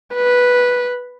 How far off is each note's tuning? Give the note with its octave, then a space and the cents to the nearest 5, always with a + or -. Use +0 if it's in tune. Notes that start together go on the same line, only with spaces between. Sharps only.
B4 -5